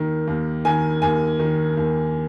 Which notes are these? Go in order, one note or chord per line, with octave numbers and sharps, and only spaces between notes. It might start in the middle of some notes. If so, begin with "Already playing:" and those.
Already playing: D#2 D#3
D#2
D#3 G#5
D#2 G#5
D#3
D#2